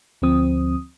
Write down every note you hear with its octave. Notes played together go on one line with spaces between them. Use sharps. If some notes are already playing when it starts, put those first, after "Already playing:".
D2 F3 C4 D#6